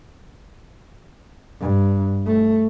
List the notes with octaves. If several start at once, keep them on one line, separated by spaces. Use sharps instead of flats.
G2
A3